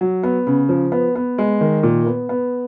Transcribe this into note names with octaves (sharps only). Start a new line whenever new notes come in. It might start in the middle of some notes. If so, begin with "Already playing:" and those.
F#3
B3
C#3
F3
B3
B3
G#3
D#3
A#2
B3
B3